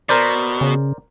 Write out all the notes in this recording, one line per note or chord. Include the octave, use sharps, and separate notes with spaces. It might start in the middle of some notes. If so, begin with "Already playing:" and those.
B2 A#4 C5 D5
C#3